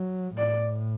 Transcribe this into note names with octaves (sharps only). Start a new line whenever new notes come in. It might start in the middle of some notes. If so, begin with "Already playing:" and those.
Already playing: F#3
A2 D5